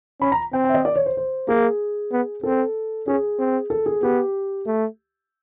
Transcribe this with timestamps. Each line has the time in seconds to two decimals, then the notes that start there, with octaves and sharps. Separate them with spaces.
0.21 C#4 B5
0.32 A#5
0.53 C4 G5
0.64 G5
0.69 E5
0.74 D#5
0.85 D5
0.96 C#5
1.06 C5
1.17 C5
1.48 A#3 G#4
2.12 B3
2.43 C4 A4
3.07 C#4 G#4
3.39 C4
3.70 A4
3.86 G#4
4.02 B3 G4
4.67 A3